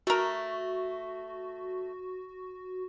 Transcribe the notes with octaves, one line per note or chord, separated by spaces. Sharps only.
A3 F#4 A#4